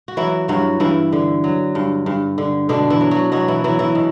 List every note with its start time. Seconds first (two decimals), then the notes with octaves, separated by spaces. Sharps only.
0.08 F#4
0.17 E3 F#3 E4
0.48 G2 F#3 F#4
0.80 G2 E3 E4
1.12 D3
1.44 F#3
1.75 G2
2.06 G2
2.38 D3
2.69 B2 D3 D4
2.90 E3 E4
3.01 F#3
3.11 F#3 F#4
3.32 B2 F#3 F#4
3.48 E3 E4
3.64 E3 F#3 E4
3.79 E3 E4
3.95 B2